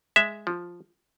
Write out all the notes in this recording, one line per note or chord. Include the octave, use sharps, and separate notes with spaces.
G#3 E5
F3